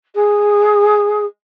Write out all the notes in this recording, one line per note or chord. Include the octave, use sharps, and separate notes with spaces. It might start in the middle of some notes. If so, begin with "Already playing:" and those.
G#4